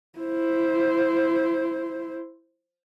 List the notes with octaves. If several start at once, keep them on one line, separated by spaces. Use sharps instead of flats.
E4 C5